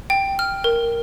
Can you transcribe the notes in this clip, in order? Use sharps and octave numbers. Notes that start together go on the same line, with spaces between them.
G5
F6
A#4